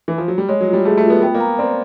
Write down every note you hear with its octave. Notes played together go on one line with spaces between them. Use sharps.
E3
F3
F#3
G3
G#3 C#5
F#3
F4
G3
A3 G#4
A3
F4
B3
B3 G5
A#3
A#5
C4 D5